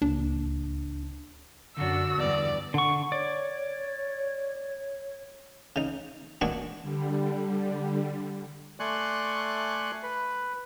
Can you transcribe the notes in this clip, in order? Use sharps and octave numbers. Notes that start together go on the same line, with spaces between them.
D1 C#2 A#3 D4
F#2 D3 D4 F#4 E6
E2 G2 D5
D3 F#5 C#6
C#5 D5
C#3 D#4
A#2 G#3 D4 F#4 G#4 C#6
D3 G3
A3 D5 G#5 C6 C#6 F#6
B4